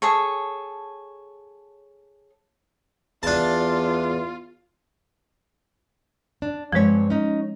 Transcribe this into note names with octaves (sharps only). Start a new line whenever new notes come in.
G#4 A4 C#5
E2 D4 F4 A5
D4
G2 F3 G#3 C4 C#5
C#4 D#4